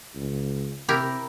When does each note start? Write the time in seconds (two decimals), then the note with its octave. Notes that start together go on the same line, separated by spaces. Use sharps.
0.16 C#2
0.88 C3 E4 G4 A#4